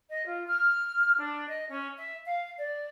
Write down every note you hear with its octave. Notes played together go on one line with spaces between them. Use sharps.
D#5
F4
F6
D4
D#5
C#4
E5
F5
D5